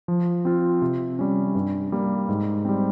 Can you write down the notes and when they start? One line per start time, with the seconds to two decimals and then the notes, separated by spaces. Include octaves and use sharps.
0.08 F3
0.45 C4 F4
0.82 C3
1.19 G3 C#4
1.55 G2
1.92 G3 A#3
2.29 G#2
2.65 G3 C4